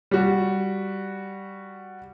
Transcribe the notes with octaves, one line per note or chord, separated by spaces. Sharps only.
G3 F#4